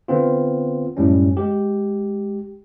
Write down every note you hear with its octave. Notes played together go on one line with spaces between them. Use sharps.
D3 B3 C4 F4
F#2 A2 G3 C#4
G#3 G4